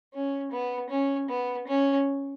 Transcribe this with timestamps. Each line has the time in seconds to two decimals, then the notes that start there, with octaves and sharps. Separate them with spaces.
0.14 C#4
0.51 B3
0.90 C#4
1.29 B3
1.68 C#4